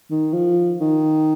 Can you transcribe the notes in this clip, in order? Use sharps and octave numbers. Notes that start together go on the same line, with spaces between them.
D#3
F3
D#3